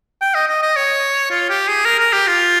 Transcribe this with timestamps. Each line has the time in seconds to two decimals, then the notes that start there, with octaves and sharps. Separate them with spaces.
0.21 G5
0.34 D#5
0.48 D#5
0.62 D#5
0.76 C#5
1.30 F4
1.49 G4
1.68 G#4
1.85 A#4
1.99 A#4
2.13 G4
2.27 F4